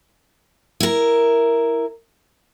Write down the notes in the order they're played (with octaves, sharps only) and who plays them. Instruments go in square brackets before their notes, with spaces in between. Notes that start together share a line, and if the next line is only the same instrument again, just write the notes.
[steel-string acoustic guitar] E4 A#4